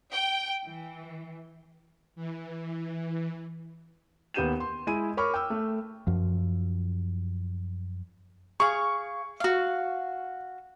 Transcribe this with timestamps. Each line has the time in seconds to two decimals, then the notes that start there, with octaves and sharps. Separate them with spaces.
0.12 G5
0.66 E3
2.16 E3
4.34 D#2 B3 G4 G6 D#7 E7
4.60 C6
4.87 G#3 E4 G#5 D#7
5.17 A#4 C#5 B5 C#6 D6 F6
5.34 G5 E6
5.50 A3
6.07 F#2 F3
8.60 G#4 F5 C#6
9.40 F#4 F5